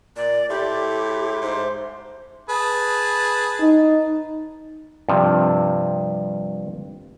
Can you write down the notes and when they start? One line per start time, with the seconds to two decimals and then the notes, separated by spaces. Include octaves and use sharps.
0.16 A#2 D5
0.50 A2 G4 E5 C6 D6
1.41 G#2 C5
2.49 G#4 B4 A5
3.60 D#4
5.09 G2 C3 F3